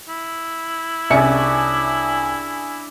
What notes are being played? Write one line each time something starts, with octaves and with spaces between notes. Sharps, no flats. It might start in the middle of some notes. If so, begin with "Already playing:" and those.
E4
C2 C#4 D4 G#4 E5 C#7